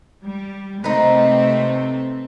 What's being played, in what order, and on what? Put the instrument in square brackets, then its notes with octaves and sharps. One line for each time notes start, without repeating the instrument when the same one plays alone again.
[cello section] G3
[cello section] C3 A3 C4 [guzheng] D#4 B4